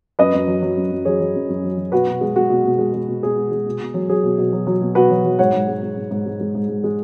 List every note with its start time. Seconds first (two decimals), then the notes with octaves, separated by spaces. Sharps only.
0.19 F#2 B4 D#5
0.34 F#2
0.47 F#3
0.62 F#3
0.77 F#2
0.91 F#2
1.05 F#3 G#4 C#5
1.20 F#3
1.35 F#2
1.49 F#2
1.64 F#3
1.77 F#3
1.92 B2 F#4 B4
2.07 B2
2.21 G#3
2.36 G#3 F#4
2.50 B2
2.65 B2
2.79 G#3
2.94 G#3
3.08 B2
3.23 B2 G#4
3.37 G#3
3.51 G#3
3.66 B2
3.80 B2
3.94 F#3
4.09 F#3 G#4
4.23 B2
4.38 B2
4.53 F#3
4.67 F#3
4.81 B2
4.95 B2 F#4 B4
5.10 F#3
5.25 F#3
5.39 G#2 C#5 F#5
5.53 G#2
5.68 G#3
5.82 G#3
5.97 G#2
6.11 G#2
6.26 G#3
6.40 G#3
6.55 G#2
6.69 G#2
6.84 G#3